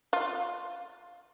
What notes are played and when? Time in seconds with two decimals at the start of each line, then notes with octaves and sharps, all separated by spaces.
0.13 F4